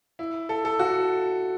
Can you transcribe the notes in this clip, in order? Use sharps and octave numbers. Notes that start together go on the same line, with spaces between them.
E4
A4
A4
F#4